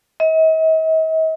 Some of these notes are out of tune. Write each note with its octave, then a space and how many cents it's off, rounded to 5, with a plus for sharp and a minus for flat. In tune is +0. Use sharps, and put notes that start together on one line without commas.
D#5 +45